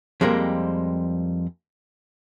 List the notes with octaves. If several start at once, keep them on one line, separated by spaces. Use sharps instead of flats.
F2 G3 G#3 A#3 C4